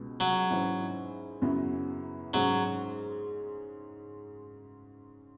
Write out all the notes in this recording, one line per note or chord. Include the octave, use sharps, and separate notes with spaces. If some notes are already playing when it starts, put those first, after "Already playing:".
Already playing: C#2 B2 G#3
F#3
G#2 E3 C#4 E4
F#2 C#3 F#3 B3 E4
G#2 F#3 G#3 C#4